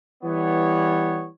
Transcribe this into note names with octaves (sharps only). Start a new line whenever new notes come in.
E3 G3 B3 C#5